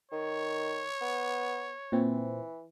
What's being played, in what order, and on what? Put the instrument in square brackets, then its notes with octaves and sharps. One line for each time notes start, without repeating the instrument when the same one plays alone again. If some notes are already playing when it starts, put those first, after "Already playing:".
[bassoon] D#3 [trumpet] C#5
[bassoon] B3
[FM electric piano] A#2 C4 [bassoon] E3